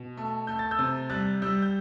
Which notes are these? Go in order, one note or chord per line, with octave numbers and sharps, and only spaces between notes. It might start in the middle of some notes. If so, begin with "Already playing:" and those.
Already playing: B2
A3
A3 G6
A6
E6 G6
C3
G3 F#6 A6
G3 E6 G6
G6